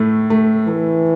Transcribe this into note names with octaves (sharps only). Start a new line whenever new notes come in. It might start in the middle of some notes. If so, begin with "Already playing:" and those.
Already playing: A2 A3
A3
E3 A3